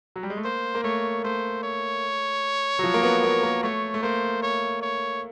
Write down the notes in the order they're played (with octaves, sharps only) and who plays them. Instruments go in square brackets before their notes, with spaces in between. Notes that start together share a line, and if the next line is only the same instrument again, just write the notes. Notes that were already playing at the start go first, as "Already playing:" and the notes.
[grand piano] F#3
G3
G#3
A3
[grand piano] A#3 [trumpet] C5
[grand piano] A#3
[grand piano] A3 [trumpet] C#5
[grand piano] A3 [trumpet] C5
[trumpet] C#5
[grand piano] F#3
F3
A#3
B3
A#3
A#3
[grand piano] A3 [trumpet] C#5
[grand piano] A3
[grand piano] A#3 [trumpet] C5
[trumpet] C#5
C#5